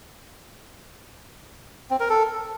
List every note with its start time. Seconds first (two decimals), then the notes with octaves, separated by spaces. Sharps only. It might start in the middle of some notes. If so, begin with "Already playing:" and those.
1.90 C4
2.00 A#4
2.10 A4